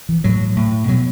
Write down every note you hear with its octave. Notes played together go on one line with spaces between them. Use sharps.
E3
A2 F#3
A2
B2 F#3